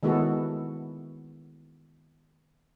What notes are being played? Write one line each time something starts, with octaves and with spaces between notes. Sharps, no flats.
D#3 G#3 B3 E4 F#4 A4